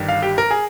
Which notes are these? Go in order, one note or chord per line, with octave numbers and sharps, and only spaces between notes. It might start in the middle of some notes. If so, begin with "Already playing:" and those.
Already playing: G1 G2 D#3
F5
G4
A#4
G#4